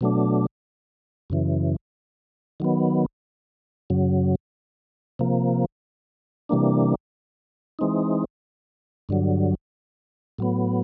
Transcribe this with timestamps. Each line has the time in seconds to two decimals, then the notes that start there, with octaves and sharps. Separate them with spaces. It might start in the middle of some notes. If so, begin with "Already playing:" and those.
0.01 B2 F#3 A3 D4
1.30 F#2 C#3 E3
2.60 D#3 F#3 B3
3.90 F#2 C#3 F#3
5.19 C3 F3 A#3
6.49 C3 E3 G3 A#3 D4
7.79 E3 G#3 C4 D#4
9.09 G2 D3 F#3
10.39 A2 F#3 B3